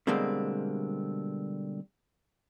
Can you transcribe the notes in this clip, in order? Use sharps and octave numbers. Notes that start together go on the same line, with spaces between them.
B2 D3 G3 G#3 A#3 C4